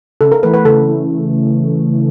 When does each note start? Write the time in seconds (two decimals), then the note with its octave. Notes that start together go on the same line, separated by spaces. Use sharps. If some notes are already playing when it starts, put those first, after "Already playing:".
0.21 C#3 A4
0.32 A#4
0.43 E3 A3 B4
0.54 B4
0.65 C#3 A4
0.87 E3 A3